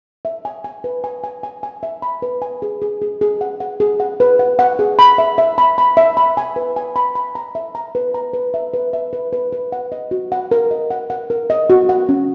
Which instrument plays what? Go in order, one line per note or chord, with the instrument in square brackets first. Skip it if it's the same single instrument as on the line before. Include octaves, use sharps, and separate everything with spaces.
[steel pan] E5
G#5
G#5
B4
G#5
G#5
G#5
G#5
E5
B5
B4
G#5
G#4
G#4
G#4
G#4
F#5
F#5
G#4
F#5
B4
F#5
F#5
G#4
B5
E5
E5
B5
B5
E5
B5
G#5
B4
G#5
B5
B5
A#5
E5
A#5
B4
A#5
B4
E5
B4
E5
B4
B4
B4
F#5
D#5
F#4
F#5
A#4
D#5
F#5
F#5
A#4
D#5
F#4
F#5
C#4